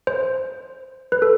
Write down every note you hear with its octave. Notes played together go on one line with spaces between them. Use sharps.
C5
B4
A4